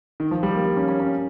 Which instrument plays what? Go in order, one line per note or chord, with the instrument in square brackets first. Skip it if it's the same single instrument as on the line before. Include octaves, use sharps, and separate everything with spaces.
[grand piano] D#3
F3
G3
A#3
A#3
C#4
C#4
C#4